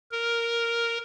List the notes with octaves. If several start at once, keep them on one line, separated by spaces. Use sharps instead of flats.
A#4